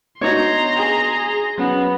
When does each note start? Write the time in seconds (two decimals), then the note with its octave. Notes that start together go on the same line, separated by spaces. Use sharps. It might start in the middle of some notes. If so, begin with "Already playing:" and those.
0.21 B3 D4 D#4 F#4 C#5 A#5 C6
0.76 G#4
1.58 F#3 B3 C#4